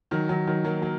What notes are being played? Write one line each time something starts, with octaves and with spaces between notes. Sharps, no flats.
D#3 F#3
D#3 F#3
D#3 F#3
F#3 A#3
F#3 A#3